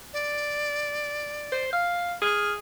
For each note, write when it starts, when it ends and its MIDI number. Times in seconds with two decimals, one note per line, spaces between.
0.13 1.64 74
1.52 1.69 72
1.73 2.13 77
2.22 2.58 68
2.22 2.52 89